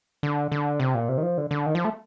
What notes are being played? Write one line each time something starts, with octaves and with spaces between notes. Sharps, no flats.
D3
D3
C3
A#2
C3
D#3
F3
D3
D3
D#3
F3
A3